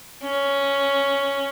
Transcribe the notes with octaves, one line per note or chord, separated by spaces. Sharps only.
C#4